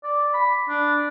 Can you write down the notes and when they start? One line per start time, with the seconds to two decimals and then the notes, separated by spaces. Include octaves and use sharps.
0.04 D5
0.34 B5
0.69 D4